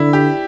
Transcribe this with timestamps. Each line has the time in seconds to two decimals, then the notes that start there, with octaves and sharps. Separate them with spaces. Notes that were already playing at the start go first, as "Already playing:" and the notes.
Already playing: D3 D4 E4
0.13 G4